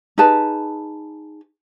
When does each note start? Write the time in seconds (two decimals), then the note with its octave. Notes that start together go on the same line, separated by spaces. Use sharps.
0.18 D#4 G#4 B4 A5